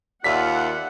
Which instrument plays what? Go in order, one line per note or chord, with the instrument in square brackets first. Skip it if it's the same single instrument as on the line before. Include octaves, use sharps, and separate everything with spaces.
[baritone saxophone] D#2 [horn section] F4 D5 E5 [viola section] F#5 [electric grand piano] B6